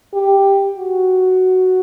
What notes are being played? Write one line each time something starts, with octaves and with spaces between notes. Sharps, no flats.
G4
F#4